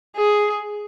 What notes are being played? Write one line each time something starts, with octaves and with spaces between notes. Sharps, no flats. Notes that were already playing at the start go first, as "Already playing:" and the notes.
G#4